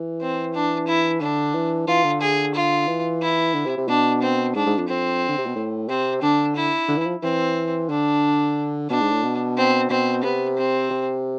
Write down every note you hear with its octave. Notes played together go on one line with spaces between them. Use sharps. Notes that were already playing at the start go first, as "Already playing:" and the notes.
Already playing: E3
C4
D4
E4
D3 D4
E3
E3 F4
D3
G#4
F4
E3
E4
D3
C3
C3
B2 D4
C4
G#2 D4
G#2
F2
F2 C4
D3
C3
B2
A2
C3 C4
D3 D4
E4
D3
E3
F3
E3 C4
D3 D4
B2 D4
G#2
A2
B2
C4
B2 C4
C3 B3
C4
C3